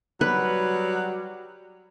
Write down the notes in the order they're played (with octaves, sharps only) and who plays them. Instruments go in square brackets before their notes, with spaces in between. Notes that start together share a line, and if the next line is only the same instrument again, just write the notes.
[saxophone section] F#3 G3 F#4 [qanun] B4